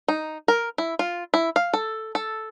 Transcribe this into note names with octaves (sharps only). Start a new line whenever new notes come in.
D#4
A#4
E4
F4
E4
F5
A4
A4